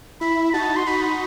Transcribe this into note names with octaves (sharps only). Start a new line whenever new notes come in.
E4 B5
B5
D#4 F#4 A5
C6
D#4 F#4 B5
B5